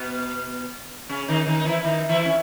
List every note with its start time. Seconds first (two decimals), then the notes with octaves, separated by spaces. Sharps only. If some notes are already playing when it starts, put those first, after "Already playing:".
Already playing: B2 B3
1.09 C#3 C#4
1.28 D#3 D#4
1.47 D#3 D#4
1.59 D#4
1.65 E3 E4
1.85 D#3 D#4
2.09 E3 E4
2.25 C#4